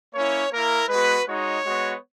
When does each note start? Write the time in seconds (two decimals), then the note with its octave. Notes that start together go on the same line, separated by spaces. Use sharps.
0.14 A#3 C#4 E4 C#5
0.52 A#3 E4 A#4
0.89 G#3 B3 F#4 B4
1.27 G#3 D#4 F#4 C#5
1.65 G#3 B3 F#4